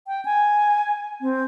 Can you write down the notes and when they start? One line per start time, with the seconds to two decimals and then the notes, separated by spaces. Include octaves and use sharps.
0.07 G5
0.25 G#5
1.21 C4